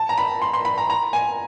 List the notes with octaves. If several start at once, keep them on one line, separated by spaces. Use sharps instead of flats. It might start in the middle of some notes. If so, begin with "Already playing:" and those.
Already playing: A5
A#5
B5
C6
C6
B5
A#5
A#5
G#5